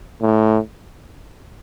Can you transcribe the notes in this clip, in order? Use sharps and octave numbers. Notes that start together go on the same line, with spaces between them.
A2